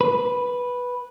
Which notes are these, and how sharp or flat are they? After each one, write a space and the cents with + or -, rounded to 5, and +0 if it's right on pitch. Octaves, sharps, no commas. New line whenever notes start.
B4 -5